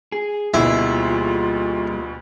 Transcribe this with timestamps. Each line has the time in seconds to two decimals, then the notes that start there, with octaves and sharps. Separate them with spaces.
0.12 G#4
0.54 D2 B2 G3 A#3 E4 F4 G#4